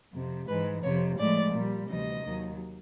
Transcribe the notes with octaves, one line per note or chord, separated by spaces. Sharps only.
F2 C3 F3
G#2 E3 G#3 B4
F2 C3 F3 C#5
A2 F3 G#3 D5
A#2 G3
D2 C3 E3 G3 D#5
D#2 D#3 F#3